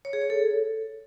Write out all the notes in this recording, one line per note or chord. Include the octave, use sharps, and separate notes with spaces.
C#5
G#4
C#5
A4